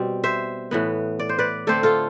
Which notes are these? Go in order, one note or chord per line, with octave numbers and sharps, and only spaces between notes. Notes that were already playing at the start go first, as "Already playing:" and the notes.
Already playing: B2 G3 C4
C5 E5
A2 E3 B3
D5
C5
B4 D5
D3 A3 C4 A4 C5
F4 A4